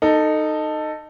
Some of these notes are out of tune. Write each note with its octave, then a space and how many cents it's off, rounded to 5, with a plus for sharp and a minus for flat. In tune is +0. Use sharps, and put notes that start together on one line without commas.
D#4 -10 A4 +10